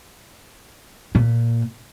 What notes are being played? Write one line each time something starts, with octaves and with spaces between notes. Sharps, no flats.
A#2